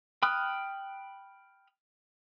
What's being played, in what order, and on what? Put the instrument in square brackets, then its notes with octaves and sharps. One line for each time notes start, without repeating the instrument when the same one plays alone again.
[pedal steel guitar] G5 B5 D#6 F6 F#6